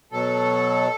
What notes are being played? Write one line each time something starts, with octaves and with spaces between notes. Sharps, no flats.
B2 F#3 A4